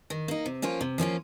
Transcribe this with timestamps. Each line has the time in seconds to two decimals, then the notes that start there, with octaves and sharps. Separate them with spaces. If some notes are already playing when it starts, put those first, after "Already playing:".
0.10 D#3
0.28 A#3 D#4
0.46 C3
0.62 F3 A#3 C#4 F4
0.81 C3
0.98 F3 A#3 C#4 F4